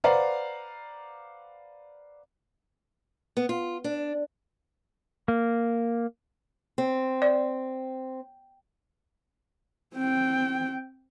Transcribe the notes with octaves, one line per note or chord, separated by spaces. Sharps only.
B4 C5 D5 F5 F#5 A#5
B3
F4
D4
A#3
C4
D5
C4 G5